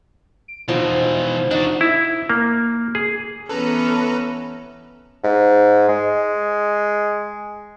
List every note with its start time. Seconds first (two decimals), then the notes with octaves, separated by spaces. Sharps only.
0.48 D7
0.68 B2 E3 F3 D#4 C5
1.51 D4 D#4 F#4
1.81 E4
2.30 A#3
2.95 G#4
3.49 E3 B3 C#4 A4 B4 A#5
5.24 G#2
5.89 G#3